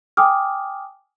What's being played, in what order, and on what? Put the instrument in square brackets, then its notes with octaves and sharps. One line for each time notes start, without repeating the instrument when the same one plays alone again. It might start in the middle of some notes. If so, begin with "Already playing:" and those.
[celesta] G5 G#5 D6 D#6 F6